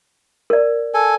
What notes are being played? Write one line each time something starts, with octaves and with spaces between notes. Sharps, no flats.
A#4 D5
A4 G#5